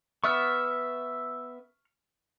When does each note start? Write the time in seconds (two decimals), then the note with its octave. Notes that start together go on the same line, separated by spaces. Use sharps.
0.24 B3 E5 C#6 F6